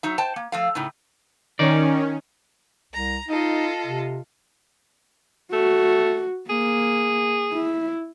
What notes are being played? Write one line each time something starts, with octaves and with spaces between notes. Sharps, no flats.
F#3 D#4 E5
C5 G5 A5
A#3
F3 A3 F5
A2 C#3 D#4
D#3 C#4 D#4 D5
C2 A#5
D#4 F4 A4 D#5
C3
A3 F#4
A#3 G#4
E4